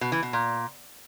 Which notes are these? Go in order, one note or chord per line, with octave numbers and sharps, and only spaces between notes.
B2
E3
B2
A#2